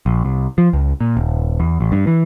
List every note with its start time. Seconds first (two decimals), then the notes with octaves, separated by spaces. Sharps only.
0.06 A#1
0.25 C2
0.58 F3
0.73 C#2
1.01 A#2
1.17 D#1
1.60 E2
1.81 A1
1.92 G2
2.07 E3